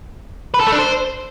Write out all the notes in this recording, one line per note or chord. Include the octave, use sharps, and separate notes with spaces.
B4
A4
A3
D4
C5